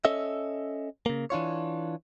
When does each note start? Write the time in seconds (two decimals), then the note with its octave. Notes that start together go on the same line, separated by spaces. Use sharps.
0.05 C#4 A4 D#5 E5
1.06 C#3 A#3
1.30 E3 D4 F4 C#5